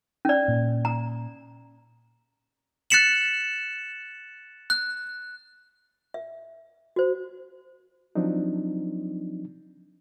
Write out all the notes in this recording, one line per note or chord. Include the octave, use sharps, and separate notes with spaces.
C#4 D5
A#2
A#5
F#6 A6 B6 C#7 E7 F#7
F#6
E5
F#4 C5
F3 F#3 C4 D4 D#4